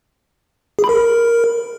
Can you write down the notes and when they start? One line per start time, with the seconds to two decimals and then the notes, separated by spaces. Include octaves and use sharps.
0.79 G#4
0.84 B5
0.89 A#4